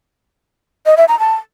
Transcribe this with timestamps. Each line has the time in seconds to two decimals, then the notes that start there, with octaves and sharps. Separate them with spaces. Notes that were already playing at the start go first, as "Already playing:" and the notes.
0.86 D#5
0.97 E5
1.08 A#5
1.19 A5